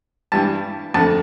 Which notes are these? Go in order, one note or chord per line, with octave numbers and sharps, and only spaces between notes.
G2 E3 G3 A5
F2 D3 A3 A5